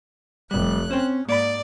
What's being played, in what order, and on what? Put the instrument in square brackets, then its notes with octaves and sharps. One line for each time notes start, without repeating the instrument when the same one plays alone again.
[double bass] F1 [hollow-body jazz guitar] G3 [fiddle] F#6
[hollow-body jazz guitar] C4 C5 [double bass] C#4
[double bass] G#2 [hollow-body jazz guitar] A#3 B5 [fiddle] D5